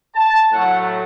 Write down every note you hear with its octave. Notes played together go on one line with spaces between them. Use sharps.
A5
A2 F#3 A3 F#5